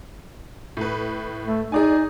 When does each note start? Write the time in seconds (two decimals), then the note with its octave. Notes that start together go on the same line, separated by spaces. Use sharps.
0.77 A2 B4
1.45 A3
1.72 D#4 G#4 D5 G#5